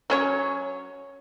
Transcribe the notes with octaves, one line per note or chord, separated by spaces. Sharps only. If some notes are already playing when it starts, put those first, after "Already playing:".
F#3 C#4 C#5